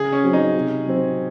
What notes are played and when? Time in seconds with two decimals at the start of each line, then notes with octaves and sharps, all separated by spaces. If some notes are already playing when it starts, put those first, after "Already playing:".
Already playing: C#3 G#4
0.12 C#4
0.24 F#3 C4
0.33 D#4
0.55 C3
0.86 F#3 C4